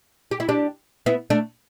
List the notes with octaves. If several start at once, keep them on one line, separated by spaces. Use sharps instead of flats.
G4
E4
D4 G4
B3 E4
A3 D4